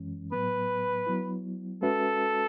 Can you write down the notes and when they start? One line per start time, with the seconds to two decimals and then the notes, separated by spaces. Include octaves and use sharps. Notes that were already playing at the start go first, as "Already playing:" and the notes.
Already playing: F#2 E3 G#3 C#4
0.32 A2 F#3 B3 B4
1.07 F#3 B3 E4
1.82 G#3 C#4 F#4 A4 B4 E5